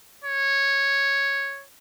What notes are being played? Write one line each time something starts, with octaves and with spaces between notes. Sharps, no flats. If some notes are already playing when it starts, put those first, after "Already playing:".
C#5